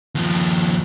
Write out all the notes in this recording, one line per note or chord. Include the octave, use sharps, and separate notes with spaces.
D#2 F3